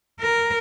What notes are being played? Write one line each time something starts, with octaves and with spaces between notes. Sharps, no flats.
A#4